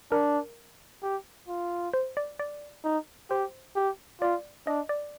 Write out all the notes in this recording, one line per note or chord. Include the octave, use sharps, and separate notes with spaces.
D4 A#4
G4
F4
C5
D5
D5
D#4
G4 C5
G4
F4 D5
D4 D#5
D5